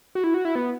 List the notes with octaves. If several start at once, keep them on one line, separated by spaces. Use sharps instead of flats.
F#4
E4
F#4
E4
B3